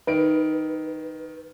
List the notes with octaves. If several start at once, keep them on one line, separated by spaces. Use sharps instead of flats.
D#3 B4 D7